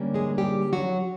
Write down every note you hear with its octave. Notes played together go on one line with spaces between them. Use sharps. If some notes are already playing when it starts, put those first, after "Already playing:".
Already playing: D3 G3 A#3 C#4
G#3 G#4
G3 G4
F#3 F#4